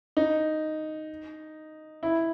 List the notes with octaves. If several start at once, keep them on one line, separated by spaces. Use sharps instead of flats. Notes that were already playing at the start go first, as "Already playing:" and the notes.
D#4
E4